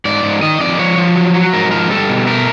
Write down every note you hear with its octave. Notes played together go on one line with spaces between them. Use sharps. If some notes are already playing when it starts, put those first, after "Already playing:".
G#2 D5
G#2
D#3 D#5
F2 D5
F3 C#5
F3
F#3
F#3
G#2 A#4
F3 A#4
G3 A4
B2
A3 A#4